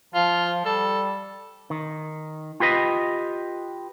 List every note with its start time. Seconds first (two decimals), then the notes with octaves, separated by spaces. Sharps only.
0.14 F3 F4
0.65 G3 A4
1.70 D#3
2.60 F4 G4 B4 D#5